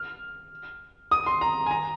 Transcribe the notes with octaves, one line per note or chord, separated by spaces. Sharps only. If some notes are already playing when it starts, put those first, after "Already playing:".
Already playing: F6
D#6
C6
A#5
G#5
A#5